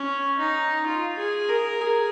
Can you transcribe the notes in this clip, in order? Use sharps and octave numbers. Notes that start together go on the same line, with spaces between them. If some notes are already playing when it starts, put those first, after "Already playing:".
Already playing: C#4
D#4
F4
G#4
A#4
G#4